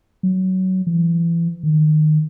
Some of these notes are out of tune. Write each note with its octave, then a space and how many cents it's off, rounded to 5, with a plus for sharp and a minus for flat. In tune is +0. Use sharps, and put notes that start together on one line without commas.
F#3 +15
E3 +30
D#3 -20